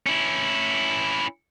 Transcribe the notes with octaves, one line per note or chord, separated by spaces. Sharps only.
C#4 E4